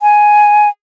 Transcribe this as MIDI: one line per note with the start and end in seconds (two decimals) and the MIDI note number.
0.01 0.69 80